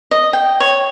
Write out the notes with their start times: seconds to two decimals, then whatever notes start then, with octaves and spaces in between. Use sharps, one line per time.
0.11 D#5
0.33 G5
0.60 C#5